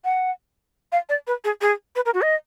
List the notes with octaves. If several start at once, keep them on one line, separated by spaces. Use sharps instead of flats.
F#5
F5
D5
B4
G#4
G#4
B4
A#4
F#4
D#5